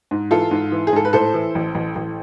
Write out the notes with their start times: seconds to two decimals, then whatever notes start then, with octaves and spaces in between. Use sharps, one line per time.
0.11 G#2
0.31 E3 F4 A4
0.51 G#2
0.72 E3
0.87 G#4
0.93 G#2 A4
1.05 B4
1.13 A2 A4 C5
1.34 E3
1.55 A1
1.75 A1
1.96 A1